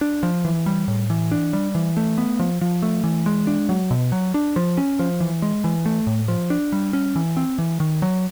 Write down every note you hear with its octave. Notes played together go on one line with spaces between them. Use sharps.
D4
F3
E3
G3
A2
E3
D4
G3
E3
A3
B3
F3
F3
A3
E3
G#3
D4
F#3
B2
F#3
D4
F3
C#4
F3
E3
G#3
E3
A3
A2
F3
D4
G3
C#4
E3
C4
E3
D#3
F#3